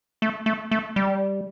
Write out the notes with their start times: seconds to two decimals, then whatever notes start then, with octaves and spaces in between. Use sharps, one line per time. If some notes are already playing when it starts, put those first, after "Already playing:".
0.22 A3
0.46 A3
0.71 A3
0.96 G3